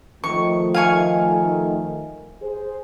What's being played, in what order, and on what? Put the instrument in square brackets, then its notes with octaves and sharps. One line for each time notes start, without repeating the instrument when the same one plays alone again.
[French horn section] D#3 F3 A3 [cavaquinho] C#6
[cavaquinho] F5 G#5 C#6
[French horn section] G#4 C5